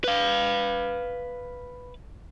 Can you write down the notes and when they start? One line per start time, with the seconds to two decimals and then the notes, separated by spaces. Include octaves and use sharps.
0.04 B4 F5